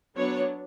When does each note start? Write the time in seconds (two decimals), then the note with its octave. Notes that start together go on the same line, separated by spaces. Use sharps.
0.15 F#3 B3 D4 C#5